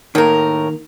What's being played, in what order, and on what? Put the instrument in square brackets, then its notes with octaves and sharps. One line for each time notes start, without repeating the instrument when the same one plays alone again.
[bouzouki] A2 A#4 [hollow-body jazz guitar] D#3 A#3